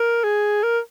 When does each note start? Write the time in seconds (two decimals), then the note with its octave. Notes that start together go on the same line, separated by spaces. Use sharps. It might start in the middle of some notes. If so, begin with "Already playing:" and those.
Already playing: A#4
0.24 G#4
0.63 A#4